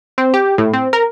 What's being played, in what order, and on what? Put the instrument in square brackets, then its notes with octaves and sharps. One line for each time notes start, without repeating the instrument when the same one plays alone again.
[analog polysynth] C4
G4
A2
C4
A#4